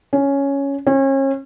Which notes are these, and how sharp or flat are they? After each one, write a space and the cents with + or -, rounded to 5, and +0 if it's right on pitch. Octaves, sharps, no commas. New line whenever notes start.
C#4 +5
C#4 -35